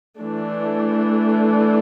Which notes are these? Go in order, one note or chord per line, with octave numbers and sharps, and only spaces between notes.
E3 A3 D4